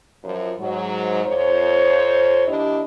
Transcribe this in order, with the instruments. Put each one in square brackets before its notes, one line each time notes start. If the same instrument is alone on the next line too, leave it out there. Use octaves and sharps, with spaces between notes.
[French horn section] F#2 F3
G#2 F#3
F2 C5 C#5
D#2 D4 E4 G4 D#5